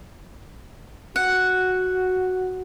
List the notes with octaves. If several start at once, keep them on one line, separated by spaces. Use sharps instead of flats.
F#4 F#5